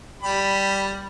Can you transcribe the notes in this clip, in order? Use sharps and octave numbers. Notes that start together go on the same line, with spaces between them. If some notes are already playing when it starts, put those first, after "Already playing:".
G3 G4 B5